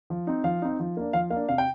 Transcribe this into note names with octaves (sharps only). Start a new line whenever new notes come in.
F3
C4 D#4
F3 F5
C4 D#4
F3
A#3 D4
F3 F5
A#3 F5
D4
C3 F5
G5